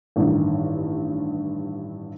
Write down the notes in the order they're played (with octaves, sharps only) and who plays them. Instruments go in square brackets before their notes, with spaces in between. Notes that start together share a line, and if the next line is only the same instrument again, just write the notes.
[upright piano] A1 G2 D#3